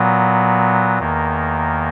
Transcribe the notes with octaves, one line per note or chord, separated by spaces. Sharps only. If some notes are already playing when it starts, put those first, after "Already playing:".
Already playing: A#2 F#3 B3
E2 D#3 A#3